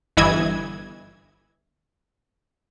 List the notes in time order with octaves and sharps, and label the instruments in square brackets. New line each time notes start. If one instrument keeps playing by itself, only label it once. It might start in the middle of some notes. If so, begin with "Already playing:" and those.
[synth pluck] G1 E3 E4 D#5 E5 G#6